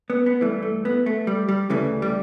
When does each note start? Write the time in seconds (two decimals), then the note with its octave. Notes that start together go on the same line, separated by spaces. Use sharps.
0.10 B3
0.26 B3
0.41 G2 E3 A3
0.63 A3
0.85 B3
1.06 A3
1.27 G3
1.49 G3
1.70 D2 C#3 E3 A3
2.02 G3